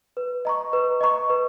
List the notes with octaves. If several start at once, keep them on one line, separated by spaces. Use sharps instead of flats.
B4
D#5 A#5 C#6
B4
D#5 A#5 C#6
B4